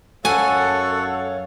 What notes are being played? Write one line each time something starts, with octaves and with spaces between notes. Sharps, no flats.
F#2 A4 C#5 F5 F#5 G#5 C#6